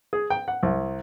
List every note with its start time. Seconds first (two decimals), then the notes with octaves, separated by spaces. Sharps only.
0.13 G#4
0.30 G5
0.48 F#5
0.63 C2